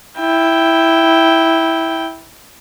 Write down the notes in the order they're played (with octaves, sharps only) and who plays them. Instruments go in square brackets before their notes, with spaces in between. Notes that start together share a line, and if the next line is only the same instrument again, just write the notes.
[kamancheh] E4 G5